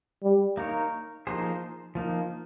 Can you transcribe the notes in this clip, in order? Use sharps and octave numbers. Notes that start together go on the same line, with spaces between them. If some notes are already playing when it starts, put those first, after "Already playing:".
G3
A#3 D#4 A#4 C#5
F3 A#3 D#4 G#4 C5
F3 A#3 D#4